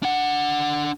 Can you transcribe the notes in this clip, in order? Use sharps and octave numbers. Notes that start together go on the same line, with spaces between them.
D4 F#5